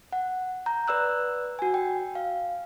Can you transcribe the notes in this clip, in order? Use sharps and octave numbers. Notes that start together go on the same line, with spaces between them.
F#5
A#5 G6
B4 D5 E6 F#6
F#4 G#5
G5
F5